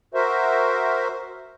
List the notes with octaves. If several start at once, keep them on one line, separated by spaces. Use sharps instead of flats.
F#4 A#4 C5 E5